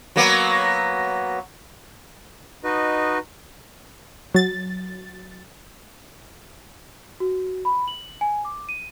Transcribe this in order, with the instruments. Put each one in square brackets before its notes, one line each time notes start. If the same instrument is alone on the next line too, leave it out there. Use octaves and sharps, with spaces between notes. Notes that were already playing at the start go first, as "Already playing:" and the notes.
[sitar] F#3 A#3 B3
[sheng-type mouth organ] D#4 F#4 B4 D#5
[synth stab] F#3 A6
[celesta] F#4
B5
F#7
G#5
D6
D#7